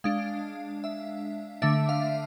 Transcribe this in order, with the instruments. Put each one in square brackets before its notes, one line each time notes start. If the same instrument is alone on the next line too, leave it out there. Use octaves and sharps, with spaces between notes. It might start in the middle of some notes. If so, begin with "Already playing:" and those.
[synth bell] G#3 D4 F5
E5
D3 A3 D4 E5
F5